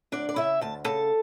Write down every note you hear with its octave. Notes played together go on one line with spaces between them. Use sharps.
D2 D4 D5
D5
C#3 E4 E5
D2 A5
C#3 A4 A5